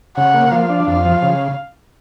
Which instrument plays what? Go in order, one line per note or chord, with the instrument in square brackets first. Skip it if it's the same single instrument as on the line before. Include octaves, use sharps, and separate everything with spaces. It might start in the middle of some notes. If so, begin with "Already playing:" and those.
[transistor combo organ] C#3 [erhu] F#5
[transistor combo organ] A#3
[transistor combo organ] F3 [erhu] F5
[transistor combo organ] D4
[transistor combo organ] F2 [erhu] F5
[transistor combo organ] F3
C#3